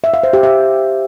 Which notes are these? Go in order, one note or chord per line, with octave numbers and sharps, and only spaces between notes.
E5
F5
C5
G4
E5